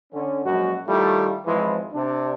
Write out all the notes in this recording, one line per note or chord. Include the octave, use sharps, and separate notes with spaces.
D3 C#4
A#1 F#2 G#3 F#4
D#3 G3 A3 E4 F4
G#1 E3 F3 G#3 E4
C3 D4